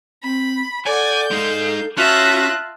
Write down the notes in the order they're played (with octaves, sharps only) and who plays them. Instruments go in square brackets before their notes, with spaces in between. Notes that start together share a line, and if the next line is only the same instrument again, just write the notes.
[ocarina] C4 [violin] B5
[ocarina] A4 [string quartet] D5 F#5 [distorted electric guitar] G#5 [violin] G6
[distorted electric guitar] G#3 D#4 [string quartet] F5
[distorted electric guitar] C#4 [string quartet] F4 F#6 A#6 [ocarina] F#4 [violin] E5 A5